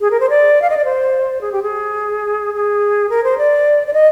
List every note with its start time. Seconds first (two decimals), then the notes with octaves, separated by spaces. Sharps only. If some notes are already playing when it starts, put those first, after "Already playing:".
0.01 G#4
0.11 A#4
0.20 C5
0.30 D5
0.62 F5
0.70 D#5
0.77 D5
0.85 C5
1.41 G#4
1.52 G4
1.63 G#4
2.54 G#4
3.10 A#4
3.24 C5
3.38 D5
3.87 D5
3.94 D#5